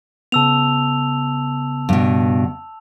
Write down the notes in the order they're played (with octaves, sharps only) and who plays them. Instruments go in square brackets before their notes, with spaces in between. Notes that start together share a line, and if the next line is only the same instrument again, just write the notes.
[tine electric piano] C#3 B3 [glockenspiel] A5 E6 F7
[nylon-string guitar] G2 B2